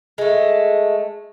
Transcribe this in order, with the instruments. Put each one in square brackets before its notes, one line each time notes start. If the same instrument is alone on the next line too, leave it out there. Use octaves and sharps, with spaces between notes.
[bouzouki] G#3 A3